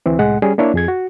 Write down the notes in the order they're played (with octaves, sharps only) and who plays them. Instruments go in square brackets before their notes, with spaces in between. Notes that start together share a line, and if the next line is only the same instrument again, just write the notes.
[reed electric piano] D2 E3 C4
C2 A2 G#3 F#5
G3 C#4 G#4
A#3 D4 E4 C#5
F2 G#4 G#6
F#4